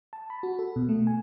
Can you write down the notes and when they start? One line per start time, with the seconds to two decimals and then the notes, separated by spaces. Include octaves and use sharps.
0.13 A5
0.30 B5
0.43 F#4
0.59 A4
0.76 B2
0.89 A3
1.07 G#5